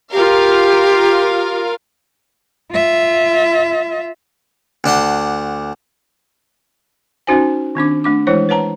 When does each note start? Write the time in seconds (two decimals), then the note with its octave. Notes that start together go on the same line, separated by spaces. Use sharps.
0.13 F4 G4 A#4 F5
2.72 F4 E5
4.84 D2 D4 F#5 C6
7.27 C#4 D#4 F#4 C5 G#5
7.75 D#3 C4 D4 D6
8.04 A3 D4 D6
8.27 E3 G#3 E4 C5 C#5
8.49 B4 C#5 F#5 A5 A#5